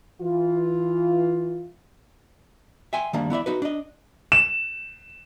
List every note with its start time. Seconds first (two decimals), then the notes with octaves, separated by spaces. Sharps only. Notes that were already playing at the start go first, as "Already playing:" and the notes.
0.21 E3 F4
2.93 E5 G5 G#5 C6
3.13 D#3 G3 A#3 D4
3.30 B3 E4 D5 E5
3.46 D#4 F#4 B4
3.62 D4 D#5
4.32 E7